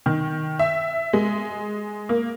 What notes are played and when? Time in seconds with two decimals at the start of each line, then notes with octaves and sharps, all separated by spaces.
0.06 D#3
0.59 E5
1.13 G#3
2.09 A#3